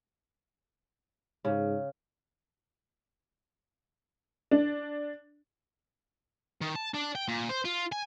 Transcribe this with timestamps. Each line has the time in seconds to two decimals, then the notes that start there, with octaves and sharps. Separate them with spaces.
1.45 G#2 C#3
4.51 D4
6.61 D#3
6.76 A5
6.94 D4
7.15 G5
7.28 A#2
7.50 C5
7.65 F4
7.92 G#5